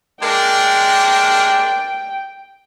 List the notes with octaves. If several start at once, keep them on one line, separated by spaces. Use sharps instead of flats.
G#3 A#3 D4 G5